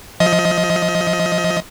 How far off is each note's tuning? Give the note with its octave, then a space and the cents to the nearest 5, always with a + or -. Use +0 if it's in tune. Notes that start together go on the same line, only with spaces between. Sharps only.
F3 +0 D#5 +25